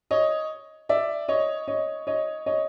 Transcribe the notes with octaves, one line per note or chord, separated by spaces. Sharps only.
C#5 D#5
D5 E5
C#5 D#5
C#5 D#5
C#5 D#5
C#5 D#5